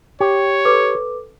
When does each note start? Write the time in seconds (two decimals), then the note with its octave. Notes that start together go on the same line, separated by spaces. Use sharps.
0.20 G4 C#5
0.65 A4 B4 D6